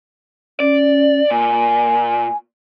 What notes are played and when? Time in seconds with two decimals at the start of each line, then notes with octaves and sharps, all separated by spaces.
0.60 C#4 D5
1.31 A#2 G#5